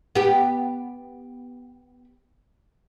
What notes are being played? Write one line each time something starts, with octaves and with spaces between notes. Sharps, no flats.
B3 G4